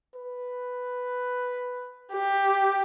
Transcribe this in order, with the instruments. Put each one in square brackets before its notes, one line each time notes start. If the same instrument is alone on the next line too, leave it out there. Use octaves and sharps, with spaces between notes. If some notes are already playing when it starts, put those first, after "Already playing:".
[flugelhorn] B4
[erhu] G4